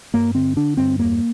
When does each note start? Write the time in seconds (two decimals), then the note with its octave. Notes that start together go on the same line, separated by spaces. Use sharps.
0.14 G2 A#3
0.35 D3 C4
0.56 D3 D4
0.77 G2 C4
0.99 E2 A#3